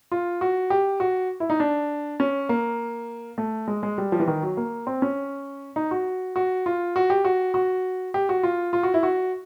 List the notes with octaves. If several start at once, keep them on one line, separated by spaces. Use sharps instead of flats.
F4
F#4
G4
F#4
E4
D#4
D4
C#4
A#3
A3
G#3
G#3
G3
F3
E3
D#3
F#3
A#3
C4
C#4
D#4
F#4
F#4
F4
F#4
G4
F#4
F#4
G4
F#4
F4
F4
F#4
E4
F#4